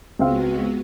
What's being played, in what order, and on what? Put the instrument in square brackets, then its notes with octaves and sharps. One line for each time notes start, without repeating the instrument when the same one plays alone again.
[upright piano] C#2 C4 F5 [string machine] G#3 B3 F#4